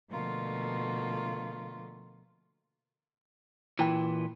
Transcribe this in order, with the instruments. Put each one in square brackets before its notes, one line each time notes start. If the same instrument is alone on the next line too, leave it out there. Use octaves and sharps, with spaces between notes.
[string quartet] B2 D3 F3 A3 A#3 F4
[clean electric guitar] A#2 E3 [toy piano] E4 G5 B5